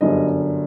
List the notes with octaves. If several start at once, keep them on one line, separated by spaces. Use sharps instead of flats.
G1 F#2 D3 G3 D#5